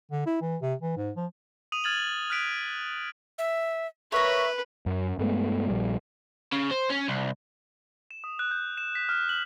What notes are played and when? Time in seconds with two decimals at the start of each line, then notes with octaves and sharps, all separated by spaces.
0.11 D3
0.26 E4
0.41 E3
0.62 C3
0.81 E3
0.97 G#2
1.16 F3
1.72 D#6 D#7 F7
1.84 F6 G#6 A6 F7 F#7
2.30 F6 F#6 B6 D7 F7
3.38 E5
4.12 A#4 B4 C#5 E5
4.86 F#2
5.19 G2 G#3 A3 B3
5.69 A#1 G3
6.52 C#3
6.71 C5
6.90 C#4
7.08 C2
8.11 E7
8.24 D#6
8.39 F#6
8.51 G6
8.77 E7
8.95 B6
9.09 F6
9.29 F#7